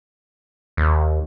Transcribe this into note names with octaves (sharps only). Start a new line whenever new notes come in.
D#2